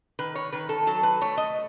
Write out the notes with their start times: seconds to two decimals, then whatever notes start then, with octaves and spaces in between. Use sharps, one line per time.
0.19 D#3 B4
0.35 C#5
0.52 D#3 B4
0.69 A4
0.87 F#3 A4
1.03 B4
1.21 A3 C#5
1.38 D#5